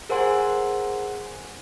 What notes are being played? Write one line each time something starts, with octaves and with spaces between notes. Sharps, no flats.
G#4 A#4 C5 F#5 G#5 C6